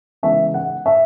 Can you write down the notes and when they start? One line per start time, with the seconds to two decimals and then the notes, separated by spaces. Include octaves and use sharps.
0.23 C#3 E3 G#3 B3 D#4 E5
0.54 F#5
0.86 E5